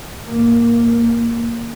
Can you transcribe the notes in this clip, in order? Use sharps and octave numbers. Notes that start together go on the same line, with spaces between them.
G#1 A#3